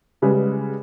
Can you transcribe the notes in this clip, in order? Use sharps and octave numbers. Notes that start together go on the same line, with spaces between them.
C#3 G3 G#3 G#4 B4